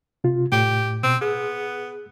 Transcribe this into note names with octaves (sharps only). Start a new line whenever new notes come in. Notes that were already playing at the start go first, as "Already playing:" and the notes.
C3 F4
A2 G4
B2 C4
B3 G#4